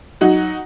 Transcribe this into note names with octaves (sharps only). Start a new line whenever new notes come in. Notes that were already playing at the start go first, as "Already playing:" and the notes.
F#3 D#4 F#4